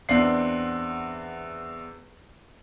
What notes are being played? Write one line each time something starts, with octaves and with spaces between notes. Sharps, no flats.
E2 C4 D4 F#5 C7